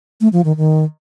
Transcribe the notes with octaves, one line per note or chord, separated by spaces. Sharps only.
A3
F3
D#3
D#3